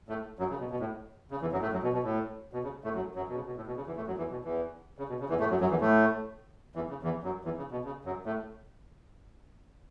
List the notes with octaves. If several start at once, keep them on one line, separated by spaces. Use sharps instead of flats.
A2 A3
F#2 F#3
C#3
B2
B2
A2
C#3
E2 E3
F#2 F#3
A2 A3
F#2 F#3
B2
B2
A2
B2
C#3
A2 A3
F#2 F#3
F#2 F#3
B2
C#3
B2
A2
B2
C#3
E2 E3
A2 A3
F#2 F#3
E2 E3
B2
E2 E3
C#3
B2
C#3
E2 E3
A2 A3
F#2 F#3
F#2 F#3
E2 E3
A2 A3
E2 E3
C#3
E2 E3
F#2 F#3
E2 E3
C#3
B2
C#3
F#2 F#3
A2 A3